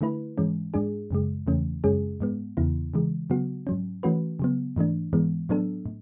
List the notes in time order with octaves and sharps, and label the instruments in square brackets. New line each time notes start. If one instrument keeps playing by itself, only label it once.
[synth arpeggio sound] D3 A3 E4 B4
G#2 E3 G#3 C#4
G#2 G#3 D4 G#4
F#2 C#3 G#3
E2 C#3 E3 A3 C#4
F#2 C#3 G#3 C#4 G#4
G#2 G#3 B3
E2 C#3 E3 B3 E4
C#3 E3 G#3
C#3 F#3 B3 F#4
G#2 F#3 C#4
E3 A3 C#4 F#4 B4
C#3 F#3 B3
G#2 E3 A3 D4
G#2 E3 G#3 B3
A2 F#3 B3 D4 A4
A2